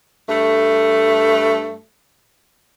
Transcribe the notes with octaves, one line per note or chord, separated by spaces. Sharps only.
G2 A3